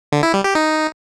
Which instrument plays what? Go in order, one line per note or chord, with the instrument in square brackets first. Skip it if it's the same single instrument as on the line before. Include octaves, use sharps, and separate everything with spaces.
[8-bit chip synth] D3
E4
G3
G4
D#4